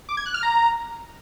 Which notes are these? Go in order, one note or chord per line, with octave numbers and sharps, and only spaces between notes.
D6
G#6
F#6
F6
A#5